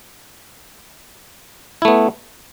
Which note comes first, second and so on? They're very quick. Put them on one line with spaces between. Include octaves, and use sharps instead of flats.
E4 A3 B3